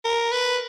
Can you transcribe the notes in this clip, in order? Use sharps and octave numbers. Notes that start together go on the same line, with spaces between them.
A#4
B4